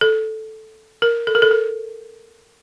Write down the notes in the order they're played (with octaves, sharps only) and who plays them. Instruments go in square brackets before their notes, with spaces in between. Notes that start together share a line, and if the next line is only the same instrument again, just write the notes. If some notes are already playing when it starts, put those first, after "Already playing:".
[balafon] A4
A#4
A4
A#4
A4
A#4